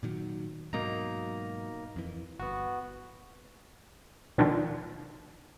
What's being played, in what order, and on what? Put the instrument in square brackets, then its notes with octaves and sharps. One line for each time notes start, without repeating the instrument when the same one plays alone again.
[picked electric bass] A#2 D#3 F#3
[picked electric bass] G#2 B2 F#3 [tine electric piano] A#3 D#4 A#5
[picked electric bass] F2 E3
[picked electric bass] G1 [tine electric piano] B3 F#4
[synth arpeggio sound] B2 D3 D#3 F3